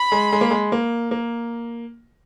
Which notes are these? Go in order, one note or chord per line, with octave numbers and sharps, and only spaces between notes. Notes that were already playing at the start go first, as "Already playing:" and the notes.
Already playing: B5
G#3
G#3
A#3
G#3
A#3
A#3